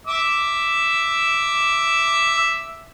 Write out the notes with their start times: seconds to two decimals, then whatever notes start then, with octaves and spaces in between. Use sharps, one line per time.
0.07 E5 D6 E6